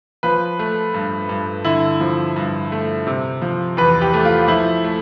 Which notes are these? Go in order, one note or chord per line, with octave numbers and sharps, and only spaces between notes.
F3 B4
A3
G2
G2
D3 E4
F3
G2
A3
C3
F3
E2 B4
G4
A3
F4
F3 E4
A3